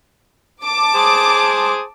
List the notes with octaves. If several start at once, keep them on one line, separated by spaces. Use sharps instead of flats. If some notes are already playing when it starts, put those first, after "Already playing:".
A5 D6
G#4 C5 D#6